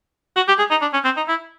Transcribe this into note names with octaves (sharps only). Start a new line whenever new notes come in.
F#4
G4
G#4
D#4
D4
C#4
C4
D#4
E4